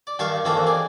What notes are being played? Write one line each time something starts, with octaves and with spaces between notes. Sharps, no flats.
D5
G2 D#3 F5 A5 C#6
D#3 E3 A#3 C4 D4 A4
G#4 D5